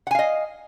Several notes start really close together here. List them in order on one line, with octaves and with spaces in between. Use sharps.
F#5 G#5 F5 D#5